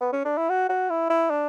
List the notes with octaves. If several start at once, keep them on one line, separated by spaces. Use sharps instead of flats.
B3
C#4
D4
E4
F#4
F#4
E4
E4
D4